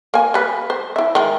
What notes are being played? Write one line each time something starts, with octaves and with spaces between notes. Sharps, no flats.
A#3 G#5
G3 B4
C5
E4 E5
D#3 G#3 G5